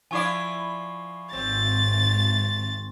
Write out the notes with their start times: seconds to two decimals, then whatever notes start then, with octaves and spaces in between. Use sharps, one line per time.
0.11 F3 E4 D5 G#5 C#6 C7
1.33 G#1 C4 A6